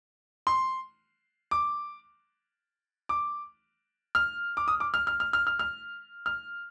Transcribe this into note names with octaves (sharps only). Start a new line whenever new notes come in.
C6
D6
D6
F6
D6
D#6
D6
F6
F6
F6
F6
F6
F6
F6